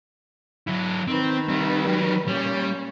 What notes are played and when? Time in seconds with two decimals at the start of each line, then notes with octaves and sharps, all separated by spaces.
0.68 F#3 E4
1.08 D#3 C4 B4
1.49 G3 C4
1.87 F#3 G4
2.28 A#2 G3 C#4